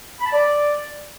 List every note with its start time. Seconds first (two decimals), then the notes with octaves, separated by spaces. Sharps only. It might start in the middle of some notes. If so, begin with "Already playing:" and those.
0.19 B5
0.26 A5
0.32 D5